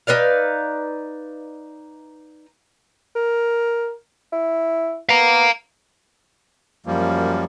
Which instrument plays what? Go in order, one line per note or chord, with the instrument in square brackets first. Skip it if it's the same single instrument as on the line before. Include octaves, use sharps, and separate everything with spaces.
[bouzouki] D#4 B4 D5 F5
[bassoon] A#4
E4
[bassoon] B3 [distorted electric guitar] F5 A#5
[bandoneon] F#2 F3 G3 A#3